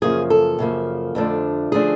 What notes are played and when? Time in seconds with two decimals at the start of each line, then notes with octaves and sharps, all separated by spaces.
0.02 F#2 C#3 F3 A#3 G#4
0.30 A4
0.59 F#2 C#3 F3 A#3
1.15 F2 D3 F3 A3 D4
1.72 D3 F3 A3 D4 G#4